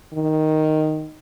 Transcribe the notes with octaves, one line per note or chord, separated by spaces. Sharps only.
D#3